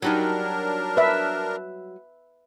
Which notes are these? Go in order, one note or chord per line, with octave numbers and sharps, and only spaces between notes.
F#3 G3 D4 D#4 A#4
B4 E5